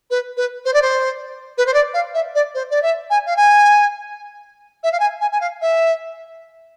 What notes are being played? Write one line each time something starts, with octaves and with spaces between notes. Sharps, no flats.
B4
B4
C5
D5
C5
B4
C5
D5
F5
E5
D5
C5
D5
E5
G#5
F5
G#5
E5
F5
G#5
G#5
G#5
F5
E5